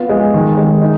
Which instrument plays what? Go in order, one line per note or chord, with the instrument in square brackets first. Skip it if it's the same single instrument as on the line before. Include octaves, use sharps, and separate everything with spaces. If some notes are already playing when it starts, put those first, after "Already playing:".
Already playing: [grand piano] B3 F4
G#3
D#3
G#3
D#4